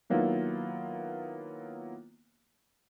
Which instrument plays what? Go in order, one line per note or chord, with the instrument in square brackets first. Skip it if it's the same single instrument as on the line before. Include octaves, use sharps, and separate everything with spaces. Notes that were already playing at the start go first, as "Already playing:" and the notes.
[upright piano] D#3 F#3 A#3 B3 E4 F4